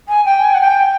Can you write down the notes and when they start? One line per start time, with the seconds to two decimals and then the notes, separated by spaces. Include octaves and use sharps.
0.08 G#5
0.25 G5
0.44 G#5
0.54 F#5
0.61 G5